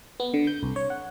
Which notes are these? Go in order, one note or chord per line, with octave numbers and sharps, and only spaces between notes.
B3
D3
G6
C2
C#5
F#5